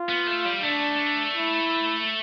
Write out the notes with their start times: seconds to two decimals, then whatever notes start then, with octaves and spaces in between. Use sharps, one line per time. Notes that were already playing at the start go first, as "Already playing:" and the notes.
Already playing: F4
0.09 B3
0.27 A3
0.45 G3
0.63 A3 D4
1.36 E4